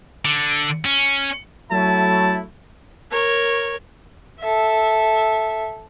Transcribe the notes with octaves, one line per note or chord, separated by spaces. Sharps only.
D3
C#4
F#3 A3 E4 A5
A#4 C#5
A4 E5